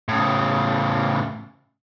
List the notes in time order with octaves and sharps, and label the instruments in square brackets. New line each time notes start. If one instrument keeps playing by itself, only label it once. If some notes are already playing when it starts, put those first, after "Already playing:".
[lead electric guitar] A2 C#3